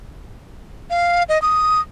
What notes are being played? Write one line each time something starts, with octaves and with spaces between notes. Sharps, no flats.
F5
D#5
D#6